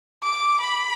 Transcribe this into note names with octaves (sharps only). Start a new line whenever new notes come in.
D6
B5